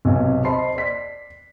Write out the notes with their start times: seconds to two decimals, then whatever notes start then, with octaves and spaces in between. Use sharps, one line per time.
0.05 B1 C3 G#5
0.44 C5 D#5 A5 B5 C6 C7
0.75 D5 B6